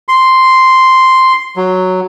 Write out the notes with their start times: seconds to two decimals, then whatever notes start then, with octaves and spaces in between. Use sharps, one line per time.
0.09 C6
1.57 F#3